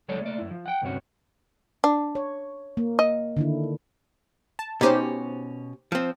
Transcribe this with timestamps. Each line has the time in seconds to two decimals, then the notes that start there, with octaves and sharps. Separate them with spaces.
0.08 C#2 F#3 G#3 A4 C#5 D5
0.21 A3 A#3 D5
0.38 F#2 E4
0.51 F3
0.66 F#5 G5
0.82 D2 G2 C3 C#4 F#4
1.84 D4
2.15 C#5
2.77 A#3
2.99 D#5
3.37 D3 D#3 E4
4.59 A5
4.81 B2 C#4 D#4 G4 C5
5.92 F3 C4